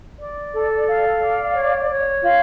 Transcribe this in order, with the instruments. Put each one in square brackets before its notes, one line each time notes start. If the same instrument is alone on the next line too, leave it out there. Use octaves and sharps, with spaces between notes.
[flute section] D5
A4
F5
D5
C#5
C#5
F4